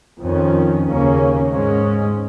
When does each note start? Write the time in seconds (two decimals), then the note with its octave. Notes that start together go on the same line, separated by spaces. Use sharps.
0.22 F2 D#3 C#4
0.86 D#2 C#3 A#3 C#4
1.49 G#2 G#3 C#4